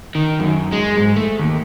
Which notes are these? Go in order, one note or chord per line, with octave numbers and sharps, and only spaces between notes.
D#3
F#2
G#3
G#2
A3
D#2